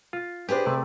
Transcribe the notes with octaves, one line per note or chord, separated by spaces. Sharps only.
F4
D4 G4 G#4 B4 C5
C3 A3 D5